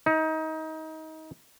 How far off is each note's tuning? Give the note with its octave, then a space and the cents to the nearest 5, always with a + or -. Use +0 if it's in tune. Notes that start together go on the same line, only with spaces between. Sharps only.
D#4 +25